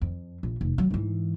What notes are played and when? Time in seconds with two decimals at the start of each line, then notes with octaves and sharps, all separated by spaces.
0.02 F2
0.43 A#1
0.61 F1
0.78 F#3
0.91 G#2 E3